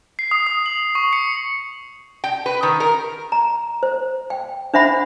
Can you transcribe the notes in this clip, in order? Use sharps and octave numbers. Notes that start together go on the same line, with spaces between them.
C7
D#6
D#6
F#7
C#6
C#7
G5
B4
D#3
A#4
A#5
C5
G5
D4 C5 E5 F#5 B5